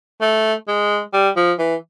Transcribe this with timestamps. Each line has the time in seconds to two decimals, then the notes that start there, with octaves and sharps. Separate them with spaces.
0.21 A3
0.68 G#3
1.13 G3
1.36 F3
1.59 E3